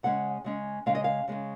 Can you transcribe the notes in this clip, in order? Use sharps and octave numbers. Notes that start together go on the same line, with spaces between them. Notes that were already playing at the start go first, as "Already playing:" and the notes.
C#3 G#3 C#4 F#5
C#3 G#3 C#4
C#3 G#3 C#4 F5
D#5
F5
C#3 G#3 C#4